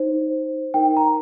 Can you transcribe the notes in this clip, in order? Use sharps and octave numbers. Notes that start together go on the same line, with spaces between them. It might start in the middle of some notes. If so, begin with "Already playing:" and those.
Already playing: D#4 C5
D#4 A#4 G5
A#5